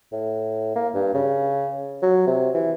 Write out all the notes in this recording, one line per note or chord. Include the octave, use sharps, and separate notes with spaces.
A2
A#3
G2
C#3
F#3
C3
E3